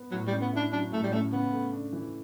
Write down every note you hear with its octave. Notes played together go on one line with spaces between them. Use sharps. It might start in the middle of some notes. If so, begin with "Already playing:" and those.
Already playing: B3
A2 F#3
G3
C#4
B3
D4 E4
F#3 D4
A2 A3
G3
A3 C#4
C#3 B3
A3
D4
E3